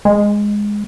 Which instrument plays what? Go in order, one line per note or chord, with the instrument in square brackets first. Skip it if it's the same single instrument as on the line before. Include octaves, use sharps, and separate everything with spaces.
[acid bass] G#3